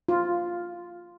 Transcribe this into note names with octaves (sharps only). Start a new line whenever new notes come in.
F4